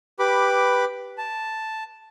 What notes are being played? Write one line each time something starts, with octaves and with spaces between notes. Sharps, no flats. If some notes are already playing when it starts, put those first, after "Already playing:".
G4 B4 B5 D6
A5